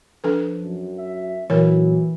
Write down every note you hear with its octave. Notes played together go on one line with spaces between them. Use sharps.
F3 D4 A4 B4
F#2
E5
A#2 E3 F#3 A#4 C#5